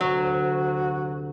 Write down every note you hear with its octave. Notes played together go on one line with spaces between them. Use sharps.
D2 C3 F#3 F#4